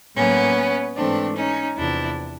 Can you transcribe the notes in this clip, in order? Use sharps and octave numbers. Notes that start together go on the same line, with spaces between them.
A2 F#3 A#3 B3 C#4
G#2 E3 A3 C4 D4
C#4 D#4
E2 C3 F3 D4 E4